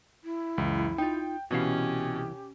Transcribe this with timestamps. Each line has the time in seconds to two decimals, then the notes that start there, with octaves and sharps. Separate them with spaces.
0.24 E4
0.58 C#2 F#2 E3
0.98 D#4 F4 G5
1.51 C2 B2 E3 C#4 G4 F5